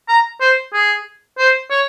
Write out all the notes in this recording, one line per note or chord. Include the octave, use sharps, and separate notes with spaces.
A#5
C5
G#4
C5
C#5